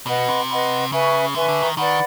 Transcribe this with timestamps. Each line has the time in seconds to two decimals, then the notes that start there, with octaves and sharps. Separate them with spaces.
0.07 B2 B4 D#5 F#5 B5
0.28 C3
0.50 B4 D#5 F#5 B5
0.92 C#3 B4 E5 G#5 C#6
1.35 D3 B4 E5 G#5 C#6
1.48 D3
1.62 D#3
1.77 D#3 B4 D5 F#5 B5